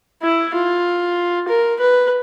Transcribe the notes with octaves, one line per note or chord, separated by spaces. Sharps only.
E4
F4
A#4
B4